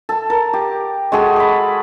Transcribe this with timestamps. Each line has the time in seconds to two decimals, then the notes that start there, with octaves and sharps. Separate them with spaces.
0.09 A4 A5
0.30 A#4
0.53 G4
1.12 G#3 F#4 G#4 A4
1.36 B5 D6